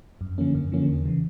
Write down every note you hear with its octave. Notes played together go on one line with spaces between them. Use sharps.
F#2
D3 F3 A#3 C#4
F#2
D3 F3 A#3 C#4
E2
C#3 E3